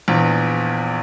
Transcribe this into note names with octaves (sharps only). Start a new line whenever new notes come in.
A#1 E2